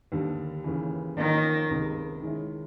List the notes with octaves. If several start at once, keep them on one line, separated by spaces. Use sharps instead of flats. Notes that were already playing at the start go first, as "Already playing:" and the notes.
D#2 D3 G3
D#2 C#3 E3
D#3 F3 A#3 C#4
C#2 C3 D#3 G#3
D#3 G#3 C#4 E4